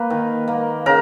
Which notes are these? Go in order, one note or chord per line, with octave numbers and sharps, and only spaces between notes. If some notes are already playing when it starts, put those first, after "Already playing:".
Already playing: A#3 B4
D#3
A#3
C#3 A#4